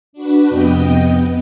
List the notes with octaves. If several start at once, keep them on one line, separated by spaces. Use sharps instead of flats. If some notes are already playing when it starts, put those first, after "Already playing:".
D4 F#4 B4
F2 C3 B3 D#5 G5
B3